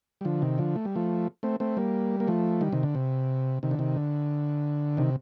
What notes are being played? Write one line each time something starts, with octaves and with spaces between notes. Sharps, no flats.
G3
D3 F3
C3 D#3
D3 F3
A3
G3
F3 A3
A3 C4
A3 C4
G3 A#3
A#3
F3 A3
D#3 G3
C3 D#3
D3
C3
C3 D#3
D3
C3 D#3
D3
C3 D#3